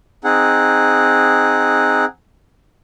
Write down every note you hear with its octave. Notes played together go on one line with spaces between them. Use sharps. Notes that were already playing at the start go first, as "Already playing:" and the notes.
C4 D#4 G#4 F#5